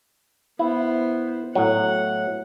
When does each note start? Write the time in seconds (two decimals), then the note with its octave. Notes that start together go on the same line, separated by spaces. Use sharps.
0.59 B3 E4 C5
1.55 A2 F#3 F#5